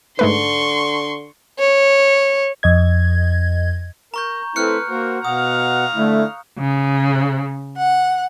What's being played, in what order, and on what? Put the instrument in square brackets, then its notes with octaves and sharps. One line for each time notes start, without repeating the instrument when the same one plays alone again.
[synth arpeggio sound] G#2 A3 B4 [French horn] D3 [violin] C6 C#6
[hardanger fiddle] C#5
[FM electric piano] F2 D#5 G#6
[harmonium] A#4 [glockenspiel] A#5 C#6 G6
[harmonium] A3 C4 E4 [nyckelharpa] B4 [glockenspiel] F6 F#6 C#7
[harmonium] A#3 F#4 C5 [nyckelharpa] A#4
[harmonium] B2 F#5 [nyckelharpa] F5 A#5 [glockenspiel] D#6
[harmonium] D3 E4 [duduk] A3
[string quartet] C#3
F#5